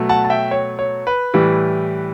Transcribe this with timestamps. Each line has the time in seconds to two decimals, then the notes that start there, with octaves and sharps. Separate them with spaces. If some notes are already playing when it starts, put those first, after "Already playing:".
Already playing: B2 F#3 A3
0.09 F#5 A5
0.25 A5
0.30 E5 G5
0.51 C#5
0.79 C#5
1.07 B4
1.34 A2 E3 G3